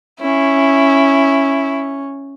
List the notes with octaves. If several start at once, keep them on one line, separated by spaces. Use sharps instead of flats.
C#4 E4